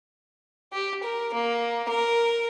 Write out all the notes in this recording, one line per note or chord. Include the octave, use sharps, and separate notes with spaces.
G4
A#4
A#3
A#4